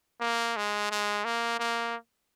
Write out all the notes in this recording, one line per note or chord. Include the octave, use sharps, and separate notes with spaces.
A#3
G#3
G#3
A#3
A#3